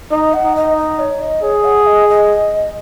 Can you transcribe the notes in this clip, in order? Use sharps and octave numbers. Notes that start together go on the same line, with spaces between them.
D#4 D#5
F#5
D#4
D#5
D#5
C#5
D#5
G#4 C#5
F#5
D#5
D#5